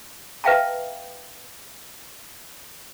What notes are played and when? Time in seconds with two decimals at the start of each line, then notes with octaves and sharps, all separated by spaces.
0.44 B4 E5 F5 G5 A5 A#5